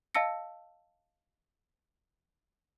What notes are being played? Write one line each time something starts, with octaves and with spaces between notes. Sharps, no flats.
D#5 F5 A5 E6 A#6 C#7